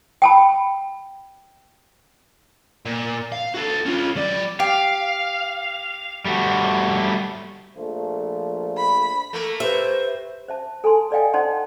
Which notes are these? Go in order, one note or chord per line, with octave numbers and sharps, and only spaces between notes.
G5 A5 B5
A#2
F5
F#4 A4
C#4 F4
F#3 D5
G4 F5
G3 A3 F#4
A#1 F3 A3
B5
A3 A#3 A#4
G4 B4 C5 E5
C5 E5 A5
A4 G#5 A5 C6
A4 D5 D#5 F5 G5 G#5
D#4 C5 D5 F#5 A5 C6